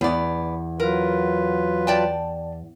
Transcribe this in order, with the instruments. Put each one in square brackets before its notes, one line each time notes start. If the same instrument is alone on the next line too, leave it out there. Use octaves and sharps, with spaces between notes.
[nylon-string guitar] E2 [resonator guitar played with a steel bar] B3 D5
[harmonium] F#3 F4 B4 [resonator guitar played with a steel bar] A#4
[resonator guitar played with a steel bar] D5 G5 A5